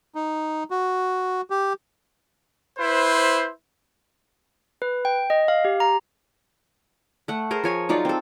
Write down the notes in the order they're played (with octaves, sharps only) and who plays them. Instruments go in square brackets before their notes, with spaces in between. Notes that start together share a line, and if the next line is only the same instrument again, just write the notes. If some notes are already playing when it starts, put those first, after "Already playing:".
[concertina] D#4
F#4
G4
[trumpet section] E4 B4 C5
[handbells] B4
G5
D#5
F5
G4
A#5
[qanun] A3 F#5
G#4 A#4 C5
F3 C#5 G#5
F#3 D#4 F4 D5
C4 A4